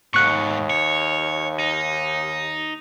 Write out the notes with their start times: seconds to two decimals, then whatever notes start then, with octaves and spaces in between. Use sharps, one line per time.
0.14 D#2 G#2 B2 C#6 F#6 C#7
0.70 C#5
1.60 D#4